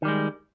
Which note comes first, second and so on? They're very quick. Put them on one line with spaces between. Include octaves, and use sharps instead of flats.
D#3 G3 G#3